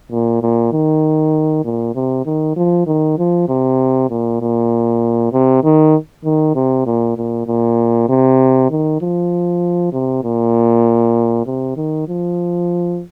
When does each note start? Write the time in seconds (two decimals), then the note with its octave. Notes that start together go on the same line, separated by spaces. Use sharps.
0.11 A#2
0.42 A#2
0.72 D#3
1.64 A#2
1.95 C3
2.26 D#3
2.56 F3
2.87 D#3
3.18 F3
3.48 C3
4.10 A#2
4.41 A#2
5.33 C3
5.63 D#3
6.25 D#3
6.55 C3
6.86 A#2
7.17 A#2
7.47 A#2
8.09 C3
8.70 D#3
9.01 F3
9.93 C3
10.24 A#2
11.46 C3
11.77 D#3
12.08 F3